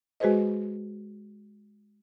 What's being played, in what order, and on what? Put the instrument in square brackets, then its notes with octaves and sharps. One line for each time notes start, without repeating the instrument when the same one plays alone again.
[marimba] G#3 F#4 G#4 B4 C5 D#5